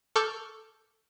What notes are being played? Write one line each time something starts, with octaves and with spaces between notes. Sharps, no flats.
A4 C#6 D6 F6 G6